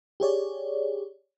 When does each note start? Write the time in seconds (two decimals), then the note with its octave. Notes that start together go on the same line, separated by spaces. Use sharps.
0.20 G4 G#4 C#5 D5